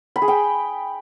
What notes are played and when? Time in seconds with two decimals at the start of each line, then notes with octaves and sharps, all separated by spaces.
0.16 B5
0.22 G#4
0.28 G5